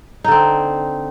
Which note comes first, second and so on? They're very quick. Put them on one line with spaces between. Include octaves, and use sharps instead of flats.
D#4 D3 C4